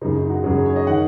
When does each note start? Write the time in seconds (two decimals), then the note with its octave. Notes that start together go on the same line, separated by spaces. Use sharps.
0.01 F#2 C#3 D#4
0.16 D#4
0.30 F#4
0.44 F#2 C#3 G#4
0.55 C#5
0.66 C#5
0.76 D#5
0.87 D#3 F#5